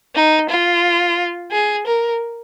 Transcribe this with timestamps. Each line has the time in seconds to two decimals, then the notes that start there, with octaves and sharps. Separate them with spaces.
0.15 D#4
0.49 F4
1.52 G#4
1.87 A#4